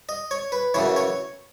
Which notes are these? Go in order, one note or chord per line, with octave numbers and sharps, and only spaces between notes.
D#5
C#5
B4
F#2 C#3 E3 C#5
C#5